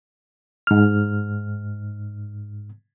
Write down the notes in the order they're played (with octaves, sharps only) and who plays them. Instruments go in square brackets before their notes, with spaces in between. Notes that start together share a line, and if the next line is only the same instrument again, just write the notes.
[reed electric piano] G#2 F6